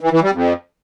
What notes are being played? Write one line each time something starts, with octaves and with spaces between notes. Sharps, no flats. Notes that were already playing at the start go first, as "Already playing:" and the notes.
E3
E3
G3
F2